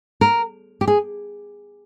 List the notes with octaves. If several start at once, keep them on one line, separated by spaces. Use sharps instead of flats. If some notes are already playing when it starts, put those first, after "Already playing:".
A#4
G4
G#4